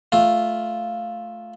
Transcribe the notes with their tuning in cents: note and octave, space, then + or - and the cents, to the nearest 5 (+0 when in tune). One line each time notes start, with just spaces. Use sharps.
A3 -5 F4 +0